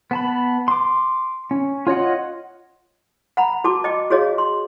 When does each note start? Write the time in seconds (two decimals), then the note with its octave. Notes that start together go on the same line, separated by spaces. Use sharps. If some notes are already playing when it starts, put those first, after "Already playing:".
0.11 B3 A5 B5
0.68 C6 D6
1.51 C#4
1.87 F4 C#5 D#5 F#5
3.37 F#5 A#5 B5
3.64 F#4 A5 D6
3.84 D#5 G5 D6
4.11 F#4 G#4 C#5 D#5 F5
4.38 C6